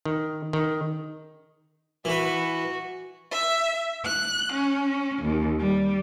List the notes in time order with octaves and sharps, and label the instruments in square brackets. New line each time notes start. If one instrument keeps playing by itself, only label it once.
[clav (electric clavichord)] D#3
D#3
[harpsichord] E3 B4 [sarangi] F#4
[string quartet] E5
F#6
C#4
D#2
G3